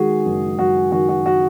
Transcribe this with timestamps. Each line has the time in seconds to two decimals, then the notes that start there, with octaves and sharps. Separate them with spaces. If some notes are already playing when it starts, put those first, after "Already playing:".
Already playing: D#3 G#3 F#4 G#4
0.26 F#1
0.59 F#1 F#4
0.92 D#3 F#4
1.09 F#4
1.26 F#4